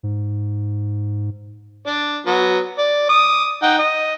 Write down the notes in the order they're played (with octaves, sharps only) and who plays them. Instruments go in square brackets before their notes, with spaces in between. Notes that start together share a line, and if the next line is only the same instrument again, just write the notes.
[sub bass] G#2
[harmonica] D4 D5
F#3 B3
D5
D6 D#6
D#4 F#5 G5
D#5